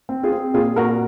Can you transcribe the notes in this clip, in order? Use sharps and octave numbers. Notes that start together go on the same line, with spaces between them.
C4
F4 G#4
C4
A#2 F4 G#4
A#2 F#4 A#4